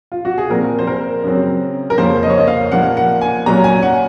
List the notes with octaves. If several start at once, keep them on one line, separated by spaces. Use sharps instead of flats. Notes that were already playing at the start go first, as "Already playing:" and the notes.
F4
F#4
G#4
A#2 F3 C4 A#4
C5
A#4
F#2 C#3 F#3 C4
A#4
F2 C#3 F3 A#3 C#4 C5
D#5
C#5
D#5
F5
A#2 F3 A#3 F#5
F#5
G#5
A#2 F#3 C#4 A#5
G#5
F#5